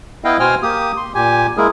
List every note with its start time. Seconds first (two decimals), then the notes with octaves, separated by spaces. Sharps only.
0.24 B3 E4 D#5 F5 G5
0.40 B2 C5 G5 G#5 F6
0.63 A#3 G4 D#6
0.97 C6
1.14 A#2 G4 G#5
1.57 G#3 A#3 E4 G#4 A#4